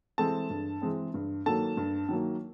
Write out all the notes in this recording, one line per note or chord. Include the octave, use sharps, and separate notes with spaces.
E3 G#3 C4 A4 A5
G2
E3 G#3 C4
G2
D#3 F#3 A#3 A4 A5
G2
D#3 F#3 A#3